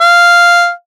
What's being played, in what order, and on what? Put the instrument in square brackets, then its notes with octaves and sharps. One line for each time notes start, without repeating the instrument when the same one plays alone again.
[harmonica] F5